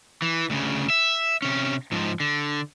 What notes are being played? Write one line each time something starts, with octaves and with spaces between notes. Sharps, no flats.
E3
D2 C#3
E5
C3 C#4
G#2 F3
D3